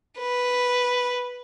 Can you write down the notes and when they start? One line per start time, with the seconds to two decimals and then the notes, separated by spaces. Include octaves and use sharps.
0.19 B4